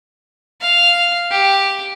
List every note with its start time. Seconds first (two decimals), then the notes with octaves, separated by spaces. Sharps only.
0.61 F5
1.30 G4